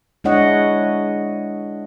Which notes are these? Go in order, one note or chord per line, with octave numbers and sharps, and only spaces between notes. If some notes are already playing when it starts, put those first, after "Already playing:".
G#3 D4 E4 C#5 D#5 F#5